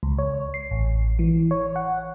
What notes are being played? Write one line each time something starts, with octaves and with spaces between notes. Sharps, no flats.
C#2
C#5
C7
A1
E3
C#5
F#5